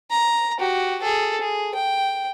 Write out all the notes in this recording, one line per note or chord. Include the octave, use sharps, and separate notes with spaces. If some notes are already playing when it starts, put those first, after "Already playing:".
A#5
F#4 G4
G#4 A4
G#4
G5